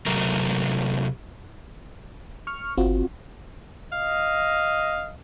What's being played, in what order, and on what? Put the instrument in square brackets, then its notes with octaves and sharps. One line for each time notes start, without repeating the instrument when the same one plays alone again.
[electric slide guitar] C3 F#3 A3 A#4
[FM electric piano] C#6 F6
[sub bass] G1 [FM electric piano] C4 F4 F#4
[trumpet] D#5 [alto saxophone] F5